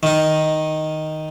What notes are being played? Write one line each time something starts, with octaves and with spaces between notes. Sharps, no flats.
D#3 D#4